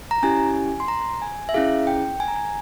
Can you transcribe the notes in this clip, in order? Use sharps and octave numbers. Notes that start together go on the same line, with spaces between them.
A#5
C#4 E4 G4 G#5
C6
A#5
G#5
E5
C#4 E4 G#4 F5
G5
G#5
A#5
G#5